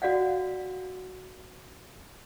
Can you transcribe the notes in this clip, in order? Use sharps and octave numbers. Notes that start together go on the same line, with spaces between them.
F#4 D5 F5 F#5